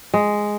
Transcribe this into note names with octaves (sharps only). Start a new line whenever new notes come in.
G#3